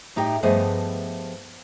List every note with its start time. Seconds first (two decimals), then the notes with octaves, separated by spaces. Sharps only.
0.16 A2 D#4 G4 G5
0.43 G2 F3 A3 B3 G#4 D#5